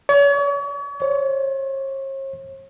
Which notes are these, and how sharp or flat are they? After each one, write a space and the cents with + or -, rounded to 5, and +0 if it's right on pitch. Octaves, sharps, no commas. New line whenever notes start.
C#5 +40
C#5 -45